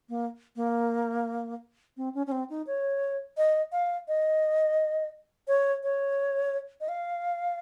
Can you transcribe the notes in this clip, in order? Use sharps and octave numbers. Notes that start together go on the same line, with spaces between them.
A#3
A#3
C4
C#4
C#4
C4
D#4
C#5
D#5
F5
D#5
C#5
C#5
D#5
F5